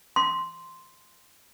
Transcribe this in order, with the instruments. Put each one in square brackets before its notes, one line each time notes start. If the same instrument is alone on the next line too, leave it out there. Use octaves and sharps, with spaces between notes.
[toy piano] C6